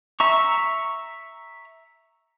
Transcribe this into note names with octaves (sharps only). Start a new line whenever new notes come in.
E5 A#5 C#6